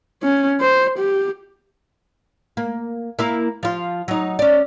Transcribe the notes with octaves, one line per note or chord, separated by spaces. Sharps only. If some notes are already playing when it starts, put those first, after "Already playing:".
C#4
C5
G4
A#3
A#3 E4 F5
F3 F4
F#3 D#4
C#4 D5